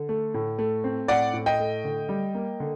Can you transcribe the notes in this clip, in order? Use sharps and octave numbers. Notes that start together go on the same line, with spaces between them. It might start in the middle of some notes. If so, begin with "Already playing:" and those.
Already playing: D3
A3
A2
A3
C4
A2 D5 F#5
A2
D#5 G5
A3
D3
G3
A#3
D3